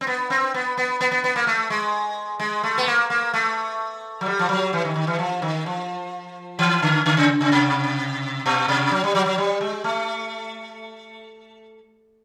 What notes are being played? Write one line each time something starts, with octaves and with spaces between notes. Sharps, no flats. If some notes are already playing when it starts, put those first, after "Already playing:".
C4
B3
C4
B3
B3
B3
B3
B3
A#3
A3
G#3
G#3
A3
B3
A#3
A#3
A3
F#3
G3
F3
F#3
E3
D#3
D#3
E3
F3
D#3
F3
E3
D3
D3
C#3
C#3
C3
B2
C3
F#3
G3
F#3
F#3
G3
G#3
A3